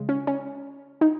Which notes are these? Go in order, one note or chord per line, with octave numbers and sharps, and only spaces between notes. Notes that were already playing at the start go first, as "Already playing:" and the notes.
Already playing: C#3 G#3
C#4
C#4
D#4